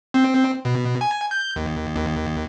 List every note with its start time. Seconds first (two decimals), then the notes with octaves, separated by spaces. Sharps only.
0.14 C4
0.65 B2
1.01 G#5
1.31 G6
1.56 D#2
1.96 D#2